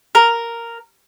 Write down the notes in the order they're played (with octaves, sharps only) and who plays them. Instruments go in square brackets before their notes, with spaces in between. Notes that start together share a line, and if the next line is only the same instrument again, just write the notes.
[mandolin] A#4